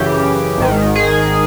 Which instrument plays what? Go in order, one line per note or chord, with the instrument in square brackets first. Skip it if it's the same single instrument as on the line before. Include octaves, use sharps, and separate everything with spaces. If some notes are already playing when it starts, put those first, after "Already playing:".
Already playing: [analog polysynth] F#2 C#3 E3 G4
G#1 G#2 D#3
G#4